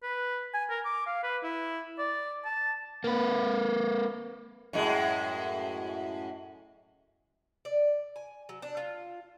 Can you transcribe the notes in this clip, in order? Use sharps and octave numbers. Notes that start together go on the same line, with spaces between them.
B4
G#5
A#4
D6
F5
B4
E4
D5
A5
A#3 B4
F#2 A2 G#3
D5
G#5
F#3
D4
F4